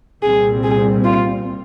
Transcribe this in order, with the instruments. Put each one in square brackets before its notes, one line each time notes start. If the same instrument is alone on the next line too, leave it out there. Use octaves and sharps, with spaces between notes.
[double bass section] C2 A#2 G3 C4 [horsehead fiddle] G#4
[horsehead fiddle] G#4
F4